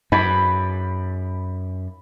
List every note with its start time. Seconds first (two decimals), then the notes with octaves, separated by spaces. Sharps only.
0.12 F#2 B5 D6